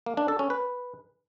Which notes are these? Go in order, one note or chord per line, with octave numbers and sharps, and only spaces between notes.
A#3
D4
A4
C#4
B4